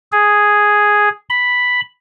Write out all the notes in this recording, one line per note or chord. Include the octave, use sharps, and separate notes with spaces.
G#4
B5